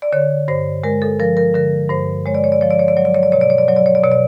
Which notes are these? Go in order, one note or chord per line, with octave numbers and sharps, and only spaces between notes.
D5
D3 C#5
G2 C5
G#3 A#4
A4
F3 A#4
A#4
D3 A#4
G2 C5
G#3 C#5
D5
C#5
D5
F3 C#5
D5
C#5
D5
F#3 C#5
D5
C#5
D5
B2 C#5
D5
C#5
D5
F#3 C#5
D5
C#5
D5
B2 C#5
D5